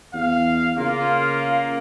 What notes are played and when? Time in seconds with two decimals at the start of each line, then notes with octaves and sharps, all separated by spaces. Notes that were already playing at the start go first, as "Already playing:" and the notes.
0.14 E2 F5
0.77 C#3 A#3 F4